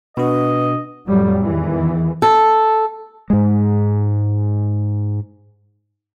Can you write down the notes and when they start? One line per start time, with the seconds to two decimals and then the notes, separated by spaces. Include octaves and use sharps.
0.17 B2 D4 F#4 B4 D#5
1.06 F2 A2 F#3 G3
1.44 E2 D#3 E3
2.22 A4
3.30 G#2 G#3